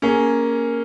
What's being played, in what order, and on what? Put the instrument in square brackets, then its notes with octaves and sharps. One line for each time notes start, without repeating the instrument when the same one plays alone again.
[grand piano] A#3 C#4 G#4